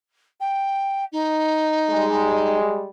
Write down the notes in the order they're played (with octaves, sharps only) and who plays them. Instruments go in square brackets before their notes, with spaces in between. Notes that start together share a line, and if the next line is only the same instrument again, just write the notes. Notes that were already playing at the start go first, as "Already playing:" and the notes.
[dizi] G5
D#4
[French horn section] G3 G#3